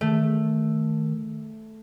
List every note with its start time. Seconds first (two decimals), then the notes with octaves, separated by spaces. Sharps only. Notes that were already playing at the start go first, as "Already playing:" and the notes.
0.01 D#3 A3